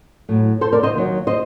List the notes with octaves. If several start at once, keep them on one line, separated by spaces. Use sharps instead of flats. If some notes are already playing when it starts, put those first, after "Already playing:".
A2 F#3
A4 C5
A#4 D5
C5 D#5
D#2 D#3 F#3
C5 D#5